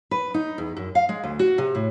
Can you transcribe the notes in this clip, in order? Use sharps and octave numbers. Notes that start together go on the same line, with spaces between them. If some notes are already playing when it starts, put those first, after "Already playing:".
B4
D#4
E2
F#2
F5
G#3
D2
F#4
C3
A2